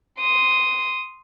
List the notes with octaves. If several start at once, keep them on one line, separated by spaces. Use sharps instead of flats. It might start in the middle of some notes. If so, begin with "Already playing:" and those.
C6 D#6